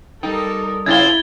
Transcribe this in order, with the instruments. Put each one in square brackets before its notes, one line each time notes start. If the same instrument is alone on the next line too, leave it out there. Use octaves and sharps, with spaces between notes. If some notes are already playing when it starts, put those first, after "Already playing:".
[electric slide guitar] G3 G5 [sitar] D#4 [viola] A4 A#4
[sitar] C#3 C4 F4 [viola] E4 [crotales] G#6 A6 G7